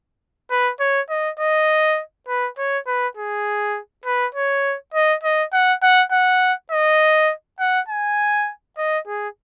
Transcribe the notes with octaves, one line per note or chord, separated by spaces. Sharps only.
B4
C#5
D#5
D#5
B4
C#5
B4
G#4
B4
C#5
D#5
D#5
F#5
F#5
F#5
D#5
F#5
G#5
D#5
G#4